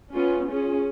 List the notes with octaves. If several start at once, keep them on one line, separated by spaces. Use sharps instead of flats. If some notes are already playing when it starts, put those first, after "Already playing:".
B3 C#4 F4
C#4 F4 G#4